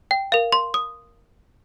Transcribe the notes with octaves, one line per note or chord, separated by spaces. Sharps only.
G5
A#4 F5
C6
D#6